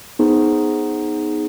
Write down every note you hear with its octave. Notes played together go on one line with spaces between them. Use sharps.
B3 D#4 G#4 C5